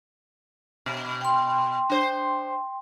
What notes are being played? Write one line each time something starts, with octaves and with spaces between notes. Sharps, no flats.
B2
G5 C6
D4 C5